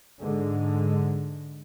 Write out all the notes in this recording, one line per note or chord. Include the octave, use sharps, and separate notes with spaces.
G#2 D3 G#3